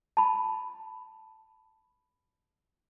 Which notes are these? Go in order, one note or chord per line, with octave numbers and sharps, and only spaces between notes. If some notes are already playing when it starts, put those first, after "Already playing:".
A5 B5